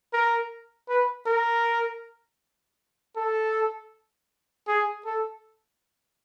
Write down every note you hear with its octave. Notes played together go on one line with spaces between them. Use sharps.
A#4
B4
A#4
A4
G#4
A4